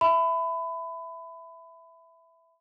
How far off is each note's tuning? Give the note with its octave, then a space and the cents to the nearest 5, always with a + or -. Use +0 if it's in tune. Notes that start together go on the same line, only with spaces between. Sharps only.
E5 +0 B5 +25